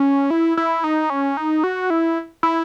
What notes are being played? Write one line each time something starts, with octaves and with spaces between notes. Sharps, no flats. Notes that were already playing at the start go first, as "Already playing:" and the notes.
Already playing: C#4
E4
E4
D#4
C#4
D#4
F#4
E4
E4